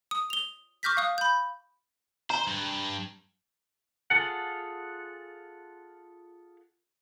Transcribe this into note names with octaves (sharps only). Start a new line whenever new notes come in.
D#6
F7 G7
C#6 D6 F6 G6 A#6 B6
F5 C#6 D#6 F#6
B5 G6
C5 A#5
G2
F4 G#4 A4 F#5